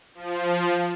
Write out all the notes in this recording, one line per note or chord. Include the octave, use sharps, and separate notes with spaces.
F3